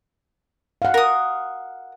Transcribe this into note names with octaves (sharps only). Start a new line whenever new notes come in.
F5 F#5
A#4 D#6